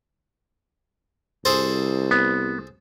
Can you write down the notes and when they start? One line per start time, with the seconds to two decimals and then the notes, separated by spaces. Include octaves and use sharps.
1.45 C2 G#4 A4 C5
2.11 B3